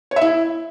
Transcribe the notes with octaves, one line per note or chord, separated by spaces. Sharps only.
C#5
E5
E4